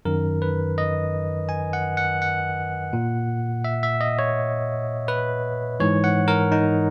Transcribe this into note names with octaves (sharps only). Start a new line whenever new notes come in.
F#2 D#3 A#4
B4
D#5
G#5
F#5
F#5
F#5
A#2
E5
E5
D#5
C#5
B4
G#2 E3 C#5
F#5
A#4
D#4